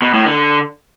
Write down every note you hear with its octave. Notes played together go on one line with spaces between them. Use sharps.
B2
A2
D3